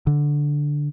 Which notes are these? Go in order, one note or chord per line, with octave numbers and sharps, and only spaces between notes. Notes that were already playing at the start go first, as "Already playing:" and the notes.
D3